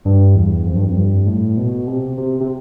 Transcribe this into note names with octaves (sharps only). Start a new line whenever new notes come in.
G2
E2
F2
G2
F2
G2
A2
B2
C3
C3
C3